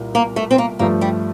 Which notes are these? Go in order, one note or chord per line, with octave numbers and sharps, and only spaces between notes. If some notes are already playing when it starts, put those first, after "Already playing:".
Already playing: C2 A#2
A#3
A3
C4
A#3
G2 F3 A3 A#3
G3